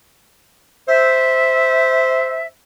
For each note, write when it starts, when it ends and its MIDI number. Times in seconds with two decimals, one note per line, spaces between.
0.88 2.46 72
0.88 2.46 76